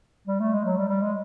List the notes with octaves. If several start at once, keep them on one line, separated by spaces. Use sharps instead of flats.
G3
A3
G#3
F#3
G3
G3
G#3